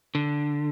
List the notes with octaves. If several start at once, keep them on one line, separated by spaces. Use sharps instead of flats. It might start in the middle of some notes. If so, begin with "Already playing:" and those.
D3